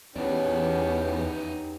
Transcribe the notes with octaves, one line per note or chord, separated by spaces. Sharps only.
E2 B3 C#4 D#4 G4 D5